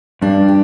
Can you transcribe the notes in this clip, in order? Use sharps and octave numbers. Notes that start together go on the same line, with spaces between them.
G2 D4
G4